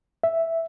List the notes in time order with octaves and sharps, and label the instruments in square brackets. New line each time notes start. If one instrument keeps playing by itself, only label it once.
[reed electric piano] E5